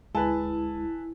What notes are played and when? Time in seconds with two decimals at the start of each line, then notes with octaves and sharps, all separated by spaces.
0.15 D2 G#3 E4 B4 G#5 A5